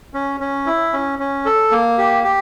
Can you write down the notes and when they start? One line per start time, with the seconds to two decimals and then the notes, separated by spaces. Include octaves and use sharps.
0.14 C#4
0.40 C#4
0.66 E4
0.93 C#4
1.19 C#4
1.45 A4
1.71 A#3
1.98 G4
2.24 G4